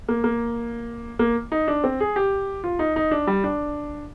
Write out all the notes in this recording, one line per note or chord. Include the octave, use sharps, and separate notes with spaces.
A#3
A#3
A#3
D#4
D4
C4
G#4
G4
F4
D#4
D#4
D4
G3
D4